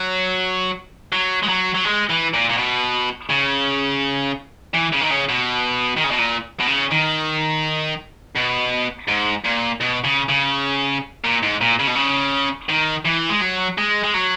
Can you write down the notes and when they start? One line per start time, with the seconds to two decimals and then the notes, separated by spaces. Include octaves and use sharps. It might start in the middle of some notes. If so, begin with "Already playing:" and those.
Already playing: F#3
1.13 F#3
1.43 G#3
1.49 F#3
1.75 F#3
1.85 G#3
2.09 E3
2.33 A#2
2.50 A#2
2.58 B2
3.30 C#3
4.74 E3
4.93 C#3
5.01 D#3
5.11 C#3
5.29 B2
5.97 D#3
6.04 C#3
6.11 B2
6.19 A#2
6.60 B2
6.67 C#3
6.91 D#3
8.35 B2
9.08 G#2
9.44 A#2
9.81 B2
10.04 C#3
10.29 C#3
11.25 A#2
11.43 G#2
11.61 A#2
11.79 C#3
11.87 B2
11.95 C#3
12.69 D#3
13.05 E3
13.30 G#3
13.41 F#3
13.78 G#3
14.04 G#3
14.14 F#3